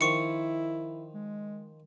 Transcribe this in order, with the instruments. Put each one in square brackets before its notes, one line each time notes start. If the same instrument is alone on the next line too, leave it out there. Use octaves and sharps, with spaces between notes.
[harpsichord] D#3 F3 [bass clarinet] E4 [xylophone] C#6 C#7
[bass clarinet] G#3